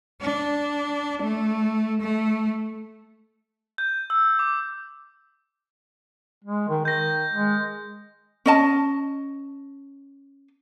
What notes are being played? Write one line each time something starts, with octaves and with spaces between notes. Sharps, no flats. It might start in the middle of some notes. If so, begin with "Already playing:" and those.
D4
A3
A3
G6
E6
D6
G#3
D#3
D#3 G6 A#6
G#3
C#4 D#5 A5